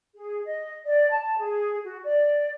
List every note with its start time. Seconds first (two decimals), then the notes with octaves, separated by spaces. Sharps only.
0.15 G#4
0.44 D#5
0.85 D5
1.11 A5
1.38 G#4
1.84 F#4
2.03 D5